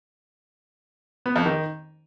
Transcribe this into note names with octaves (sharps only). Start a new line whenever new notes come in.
B3
F2
D#3